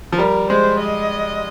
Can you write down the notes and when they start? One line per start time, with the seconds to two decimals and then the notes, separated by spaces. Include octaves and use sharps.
0.12 F3
0.18 G3 A#4
0.50 G#3 C5
0.81 D#5